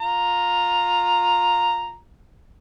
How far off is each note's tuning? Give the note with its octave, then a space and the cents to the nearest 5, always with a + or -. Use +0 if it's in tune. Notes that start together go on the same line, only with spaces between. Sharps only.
F4 +20 A#5 +0